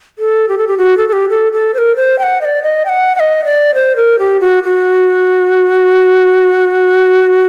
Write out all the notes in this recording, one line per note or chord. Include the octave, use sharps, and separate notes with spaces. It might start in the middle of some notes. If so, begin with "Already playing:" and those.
A4
G4
A4
G4
F#4
A4
A4
G4
A4
A4
C5
A#4
C5
G5
F#5
D#5
D5
D#5
G5
F#5
F#5
D#5
D5
C5
A#4
G4
F#4
F#4